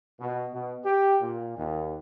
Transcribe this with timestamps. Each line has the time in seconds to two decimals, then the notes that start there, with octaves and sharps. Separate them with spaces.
0.19 B2
0.53 B2
0.85 G4
1.22 A#2
1.57 D#2